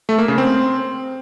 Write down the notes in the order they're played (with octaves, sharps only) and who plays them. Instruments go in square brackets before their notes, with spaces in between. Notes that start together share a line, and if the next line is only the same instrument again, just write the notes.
[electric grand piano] A3
A#3
C#3
C4